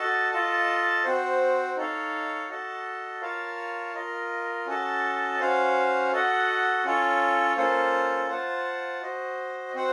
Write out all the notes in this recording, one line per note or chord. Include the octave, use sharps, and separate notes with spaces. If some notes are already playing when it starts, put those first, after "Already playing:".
Already playing: F#4 A4 D#5 A5
F4 A4 D#5 A5
C4 F#4 C5
D#4 A4 C#5 F5
F#4 A4 D#5 A5
F4 A#4 C#5 F5 A5
F4 A#4 D#5
C#4 F#4 A4 D#5 A5
C#4 F#4 C5 F5
F#4 A4 D#5 F#5
C#4 F4 A4 C#5
A#3 C#4 F4 A4 C5
F4 C5 F#5 A5
F#4 C5 D#5
C4 F#4 C5 F#5